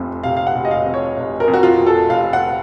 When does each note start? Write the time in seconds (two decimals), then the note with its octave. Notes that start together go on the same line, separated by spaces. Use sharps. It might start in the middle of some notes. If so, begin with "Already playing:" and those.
Already playing: F1 F2 C3
0.23 C3 F5
0.37 F5
0.47 F#5
0.55 F1
0.65 D#5
0.71 F5
0.86 F2
0.94 C#5
1.17 F1
1.40 A#4
1.48 F2
1.54 F#4
1.63 F4
1.78 F2
1.87 A4
2.09 F1 F5
2.33 F#5